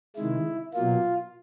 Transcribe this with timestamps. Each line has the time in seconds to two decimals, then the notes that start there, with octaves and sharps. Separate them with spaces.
0.16 C3 D#3 G#3 E4
0.74 B2 F#3 A#3 F4